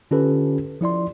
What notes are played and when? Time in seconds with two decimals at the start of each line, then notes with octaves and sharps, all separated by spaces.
0.11 D3 C#4 F4 G4 A4 B4
0.81 F3 E4 D5 C6